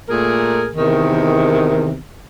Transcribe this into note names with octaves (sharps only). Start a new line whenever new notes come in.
A#2 A3 G#4 A#4
E2 C3 D#3